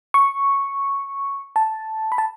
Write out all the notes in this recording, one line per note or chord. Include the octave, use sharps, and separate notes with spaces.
C#6
A5
B5
A5